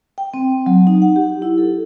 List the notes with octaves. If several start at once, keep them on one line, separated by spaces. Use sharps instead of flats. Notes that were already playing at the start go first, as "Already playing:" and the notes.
G5
C4
F#3
D#4
F#5
G4
E4
A4